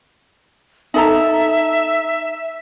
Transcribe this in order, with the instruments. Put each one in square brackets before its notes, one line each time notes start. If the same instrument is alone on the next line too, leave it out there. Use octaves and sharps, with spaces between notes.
[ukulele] D#4 A4 A#5 [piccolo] E5